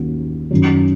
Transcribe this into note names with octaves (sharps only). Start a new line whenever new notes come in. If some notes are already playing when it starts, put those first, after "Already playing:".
Already playing: D#2 D#3 A#3 C#4 F#4
F#2 D#3 F#3